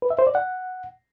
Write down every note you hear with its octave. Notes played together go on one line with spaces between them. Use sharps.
B4
E5
C5
D5
F#5